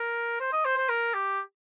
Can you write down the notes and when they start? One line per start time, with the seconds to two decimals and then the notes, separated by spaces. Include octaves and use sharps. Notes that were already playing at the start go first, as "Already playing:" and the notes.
Already playing: A#4
0.40 C5
0.52 D#5
0.65 C5
0.77 C5
0.89 A#4
1.14 G4